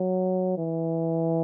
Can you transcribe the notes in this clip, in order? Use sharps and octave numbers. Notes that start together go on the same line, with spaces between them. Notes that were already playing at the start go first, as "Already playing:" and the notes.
Already playing: F#3
E3